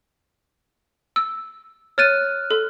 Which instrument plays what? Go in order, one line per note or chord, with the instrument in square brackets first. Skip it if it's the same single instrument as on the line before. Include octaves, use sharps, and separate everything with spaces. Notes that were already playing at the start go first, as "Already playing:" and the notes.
[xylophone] E6
[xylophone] C#5 A6 D#7 [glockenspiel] F6 F#6
[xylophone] A4